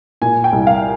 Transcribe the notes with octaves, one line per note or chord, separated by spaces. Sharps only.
A#2 G#5
G5
C2
F5